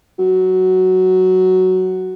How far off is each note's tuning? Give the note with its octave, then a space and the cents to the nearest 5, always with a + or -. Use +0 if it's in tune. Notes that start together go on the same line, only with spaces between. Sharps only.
F#3 +5